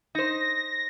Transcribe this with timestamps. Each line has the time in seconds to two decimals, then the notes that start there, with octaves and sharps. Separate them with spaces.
0.15 D#4 C5 A#6